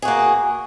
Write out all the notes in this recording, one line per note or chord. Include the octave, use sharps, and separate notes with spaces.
A#3 F#4 G#4